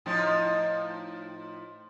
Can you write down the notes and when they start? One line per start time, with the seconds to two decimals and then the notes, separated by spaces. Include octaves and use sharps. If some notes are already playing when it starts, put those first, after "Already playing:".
0.06 A2 F3 D#4